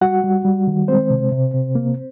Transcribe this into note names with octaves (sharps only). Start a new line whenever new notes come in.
G3 F#4 F#5
G3
G3
D#3
G#3 C4 C5
C3
C3
C3
A#3